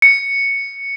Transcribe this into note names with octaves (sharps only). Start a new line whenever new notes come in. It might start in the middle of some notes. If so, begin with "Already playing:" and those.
C#7